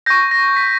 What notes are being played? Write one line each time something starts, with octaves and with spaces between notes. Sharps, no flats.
C#6 G6 A#6
A#6
B6